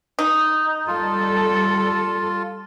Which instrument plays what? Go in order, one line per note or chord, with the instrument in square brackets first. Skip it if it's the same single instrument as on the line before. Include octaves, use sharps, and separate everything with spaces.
[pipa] D#4
[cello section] G3 A4 [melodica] F4